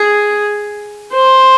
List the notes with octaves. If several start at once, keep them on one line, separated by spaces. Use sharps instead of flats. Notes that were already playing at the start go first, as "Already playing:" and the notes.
Already playing: G#4
C5